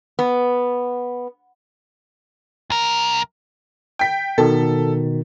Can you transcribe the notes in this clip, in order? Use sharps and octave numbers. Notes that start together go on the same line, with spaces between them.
B3
C2 A#4
G5 B6
B2 D#3 A4